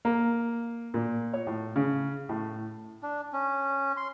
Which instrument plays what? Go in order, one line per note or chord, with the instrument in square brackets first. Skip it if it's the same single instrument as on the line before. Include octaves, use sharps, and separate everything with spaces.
[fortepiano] A#3
A#2
C#5
A2
C#3
A2
[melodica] D4
C#4
C6